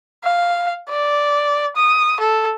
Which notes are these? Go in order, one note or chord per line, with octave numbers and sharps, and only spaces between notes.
F5
D5
D#6
A4